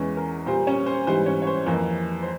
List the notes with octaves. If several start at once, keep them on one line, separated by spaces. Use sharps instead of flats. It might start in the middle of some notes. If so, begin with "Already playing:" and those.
Already playing: E2 E3 G#3 C#4
A#4
A#2 G3 A#3 C5
C#4 C#5
C5
G#2 E3 G3 C5
C#4 C#5
C#5
C5
F2 E3 A#3
C5